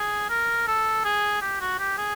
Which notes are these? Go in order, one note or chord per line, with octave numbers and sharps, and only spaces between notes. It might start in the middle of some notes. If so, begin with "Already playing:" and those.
Already playing: G#4
A#4
A4
G#4
G4
F#4
G4
G#4